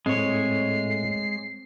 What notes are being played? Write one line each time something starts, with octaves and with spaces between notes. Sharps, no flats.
A2 G#3 C4 C#5 C7